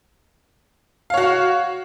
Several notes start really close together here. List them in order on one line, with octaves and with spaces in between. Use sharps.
F5 C#5 F#4